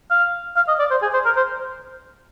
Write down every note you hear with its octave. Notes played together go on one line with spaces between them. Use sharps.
F5
F5
D#5
D5
C5
G#4
C5
A#4
C5